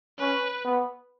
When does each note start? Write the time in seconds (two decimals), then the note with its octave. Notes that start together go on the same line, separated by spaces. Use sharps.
0.18 C#4 B4
0.65 B3